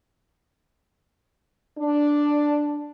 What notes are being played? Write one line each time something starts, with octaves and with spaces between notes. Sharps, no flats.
D4